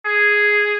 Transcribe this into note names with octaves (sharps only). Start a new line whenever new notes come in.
G#4